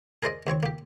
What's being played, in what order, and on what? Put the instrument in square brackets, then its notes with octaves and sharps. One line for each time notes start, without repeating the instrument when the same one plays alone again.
[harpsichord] G#4 A#4 C5 D5 D#5
D#2 C4 C#5 C#6
A#3 G4